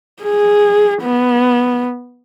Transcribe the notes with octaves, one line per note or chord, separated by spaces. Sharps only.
G#4
B3